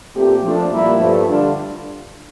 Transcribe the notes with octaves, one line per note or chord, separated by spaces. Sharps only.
A#2 A3 C4 G4
F3 A3 D4
A#2 G3 A#3 E4
G2 F3 A3
D3 G3 D4 F4